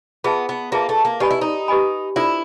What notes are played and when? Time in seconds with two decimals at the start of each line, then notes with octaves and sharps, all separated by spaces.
0.24 B3 F4 G#4 B4 E5 A5
0.49 B3
0.72 A#3 F4 G#4 B4 E5 A5
0.89 A3
1.05 A#3
1.20 D#4 G4 B4 D#5 G#5 B5
1.31 E4
1.41 D#4
1.68 G4 B4 D#5 G#5 B5
2.16 D4 E4 F4 A4 C5